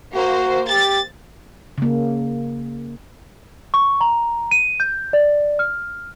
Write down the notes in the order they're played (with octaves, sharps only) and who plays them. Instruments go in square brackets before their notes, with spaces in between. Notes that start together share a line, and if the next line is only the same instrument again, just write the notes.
[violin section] A#3 C5 [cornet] F#4
[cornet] G4 [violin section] A6
[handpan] C#3 A#3
[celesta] C#6
A#5
D#7
G6
D5
F6